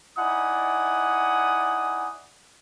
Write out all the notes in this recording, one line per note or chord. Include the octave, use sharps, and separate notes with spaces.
D#4 E4 D5 F#5 G#5 D#6